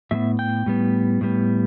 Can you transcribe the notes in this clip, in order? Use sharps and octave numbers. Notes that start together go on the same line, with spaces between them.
A2 G3 B3 E5
G5
A2 G3 B3
A2 G3 B3